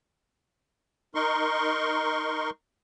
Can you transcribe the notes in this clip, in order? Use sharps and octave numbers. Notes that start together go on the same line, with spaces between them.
D#4 A#4 C6 C#6